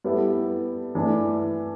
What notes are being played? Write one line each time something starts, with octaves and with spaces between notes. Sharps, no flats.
G3 B3 E4 A4
E3 A3 D4